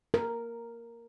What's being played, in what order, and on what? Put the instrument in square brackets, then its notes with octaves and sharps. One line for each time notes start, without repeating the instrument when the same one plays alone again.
[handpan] A#4